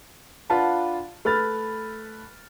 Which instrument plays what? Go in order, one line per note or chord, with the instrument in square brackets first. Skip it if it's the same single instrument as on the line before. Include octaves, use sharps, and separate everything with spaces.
[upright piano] D4 F4 B4 F#5 A5 B5
A3 B4 B5 F6 A6